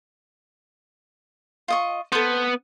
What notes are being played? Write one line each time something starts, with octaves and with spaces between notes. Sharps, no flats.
F4 D#5 C#6
B3 A4 C5